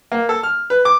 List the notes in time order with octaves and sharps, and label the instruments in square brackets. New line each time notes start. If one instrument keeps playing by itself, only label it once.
[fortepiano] A#3
A4
F6
B4
D6